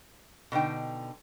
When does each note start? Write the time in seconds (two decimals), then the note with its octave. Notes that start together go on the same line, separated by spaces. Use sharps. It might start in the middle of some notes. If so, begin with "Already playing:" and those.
0.52 B2 D3 D#4 G5